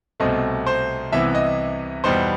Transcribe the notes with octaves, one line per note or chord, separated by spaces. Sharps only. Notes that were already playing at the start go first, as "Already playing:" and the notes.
C2 B2 A3 C4 D#5
C5
C2 C3 E3 B3 E5
D#5
E2 B2 G3 B3 D#4 C5